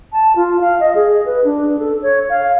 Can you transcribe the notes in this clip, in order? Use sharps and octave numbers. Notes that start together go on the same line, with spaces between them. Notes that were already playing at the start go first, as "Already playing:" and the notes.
A5
F4
F5
D#5
G#4
B4
D4
A4
C#5
F5